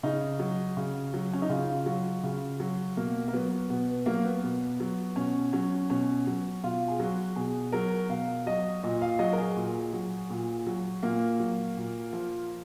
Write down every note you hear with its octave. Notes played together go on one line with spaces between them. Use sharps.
C#3 D#4
F#3
C#3
F#3
C#4
D#4
C#3 F4
F#3
C#3
F#3
B2 A#3
A#3
F#3 B3
B2 B3
F#3 A#3
B3
B2
F#3
B2 C#4
F#3 C#4
B2 C#4
F#3
B2 F4
G#4
F#3 F#4
B2 G#4
F#3 A#4
B2 F5
F#3 D#5
A#2 D#5
F5
F#3 D#5
A#4
G#4
A#2
F#3
A#2
F#3
A#2 A#3
F#3
A#2
F3